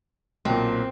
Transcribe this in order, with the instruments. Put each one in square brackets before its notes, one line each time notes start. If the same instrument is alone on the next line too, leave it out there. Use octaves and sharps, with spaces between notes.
[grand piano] B1 A#2 [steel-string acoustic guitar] C4